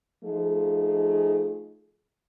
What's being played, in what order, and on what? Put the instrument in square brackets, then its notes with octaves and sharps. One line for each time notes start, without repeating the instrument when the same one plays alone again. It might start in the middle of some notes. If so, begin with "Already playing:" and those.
[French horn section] F3 A3 D#4 F4 G#4